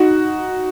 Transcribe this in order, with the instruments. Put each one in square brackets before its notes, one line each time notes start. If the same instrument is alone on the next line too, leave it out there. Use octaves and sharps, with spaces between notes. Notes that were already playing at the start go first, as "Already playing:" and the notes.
Already playing: [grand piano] D#4 F#4